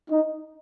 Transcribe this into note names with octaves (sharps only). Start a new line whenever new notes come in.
D#4